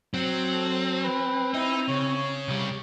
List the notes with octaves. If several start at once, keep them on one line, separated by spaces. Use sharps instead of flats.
F#3 C4
A4
B4
D#4 E4
C#3 C#5
C2 G3